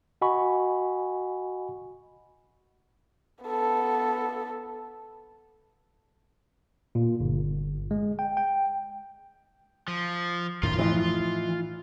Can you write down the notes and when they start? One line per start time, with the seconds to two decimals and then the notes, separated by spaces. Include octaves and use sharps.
0.22 F#4 D#5 F#5 G#5 B5 C#6
3.45 B3 A4
6.95 A#2
7.20 G1
7.91 G#3
8.19 G5
8.37 G5
9.88 F3
10.63 F#2 A2 D#3 F4 C6
10.79 A2 E3 F3 D#5